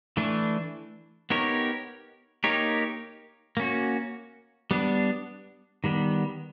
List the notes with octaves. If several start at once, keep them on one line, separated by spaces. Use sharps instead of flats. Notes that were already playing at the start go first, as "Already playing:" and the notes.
E3 A3 D4
B3 D#4 G4 A#4 C#5
A#3 D#4 G4 A#4 C#5
A#3 C#4 F#4
G3 B3 D4
D#3 G3 B3